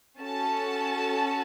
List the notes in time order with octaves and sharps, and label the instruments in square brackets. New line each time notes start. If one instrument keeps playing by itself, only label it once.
[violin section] C#4 F#4 A4 A5